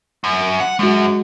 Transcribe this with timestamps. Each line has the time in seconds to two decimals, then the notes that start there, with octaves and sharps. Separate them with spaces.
0.24 F#2
0.60 F#5
0.79 F#2 G#3 F#4